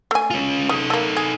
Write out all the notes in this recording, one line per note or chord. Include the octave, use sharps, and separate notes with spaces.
A3 G#5
C#4 F4
C#3 D#4 A4
A3 A#3
G#4